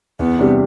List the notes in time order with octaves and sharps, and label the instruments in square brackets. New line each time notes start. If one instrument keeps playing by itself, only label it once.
[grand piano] E2 [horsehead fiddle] B3
[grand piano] C3 G3 D4 G4